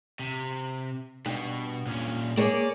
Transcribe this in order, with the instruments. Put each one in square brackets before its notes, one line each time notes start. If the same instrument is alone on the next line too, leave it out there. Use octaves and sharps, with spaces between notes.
[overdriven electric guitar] C3
[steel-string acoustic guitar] G2 [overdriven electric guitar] B2
[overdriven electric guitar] A#2 C#4
[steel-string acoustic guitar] A#3 G#4 C#5 [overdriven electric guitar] D5